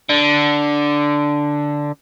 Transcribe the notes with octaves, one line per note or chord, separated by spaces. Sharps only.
D3